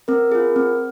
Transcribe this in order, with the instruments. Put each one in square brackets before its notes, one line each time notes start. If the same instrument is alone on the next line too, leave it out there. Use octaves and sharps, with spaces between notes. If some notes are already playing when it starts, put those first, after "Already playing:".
[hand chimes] C4 A#4
F4 G#4
C4